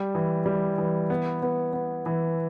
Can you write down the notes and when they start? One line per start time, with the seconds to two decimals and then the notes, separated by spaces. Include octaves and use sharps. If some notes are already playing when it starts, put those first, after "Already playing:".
Already playing: G3
0.15 E3
0.46 G3
0.78 E3
1.10 B3
1.42 B3
1.73 B3
2.06 E3